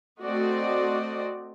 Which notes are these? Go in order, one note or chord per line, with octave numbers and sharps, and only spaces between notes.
A3 C4 F#4 D5 D#5